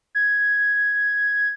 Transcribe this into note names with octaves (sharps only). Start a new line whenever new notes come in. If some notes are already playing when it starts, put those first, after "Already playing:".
G#6